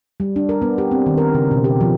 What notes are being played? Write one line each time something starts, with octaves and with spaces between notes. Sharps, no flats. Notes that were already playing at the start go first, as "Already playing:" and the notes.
G3
D4
A#4
B3
G4
C4
D#3
A#4
C#3
B2
G4
F3